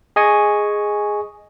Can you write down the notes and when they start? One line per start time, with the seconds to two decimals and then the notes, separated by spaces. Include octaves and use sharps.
0.16 G#4 D#5 G#5 C#6